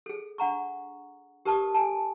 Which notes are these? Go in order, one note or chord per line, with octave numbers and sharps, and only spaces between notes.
G#4 A4
D4 F#5 A#5 C#6
G4 A#4 B4 A5 C#6 D#6
A4 G#5 A5